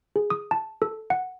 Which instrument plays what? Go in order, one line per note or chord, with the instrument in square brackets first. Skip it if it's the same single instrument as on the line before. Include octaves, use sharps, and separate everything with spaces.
[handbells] G#4
D#6
A5
A4
F#5